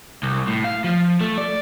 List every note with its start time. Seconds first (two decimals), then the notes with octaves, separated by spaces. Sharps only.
0.23 C2
0.47 A2
0.64 F5
0.84 F3
1.21 A3
1.38 D5